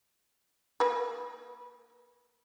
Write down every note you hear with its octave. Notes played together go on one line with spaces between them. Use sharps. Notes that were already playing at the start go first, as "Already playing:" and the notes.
A#3 B4